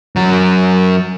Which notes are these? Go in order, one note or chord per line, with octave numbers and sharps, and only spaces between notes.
F#2 F#3